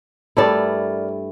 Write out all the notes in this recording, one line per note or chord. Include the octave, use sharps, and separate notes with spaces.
G2 A3 E4 A#4 D5